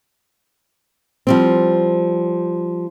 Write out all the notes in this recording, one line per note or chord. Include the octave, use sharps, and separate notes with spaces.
F3 G3 C4